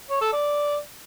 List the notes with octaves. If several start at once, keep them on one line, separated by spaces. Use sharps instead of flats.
C#5
A4
D5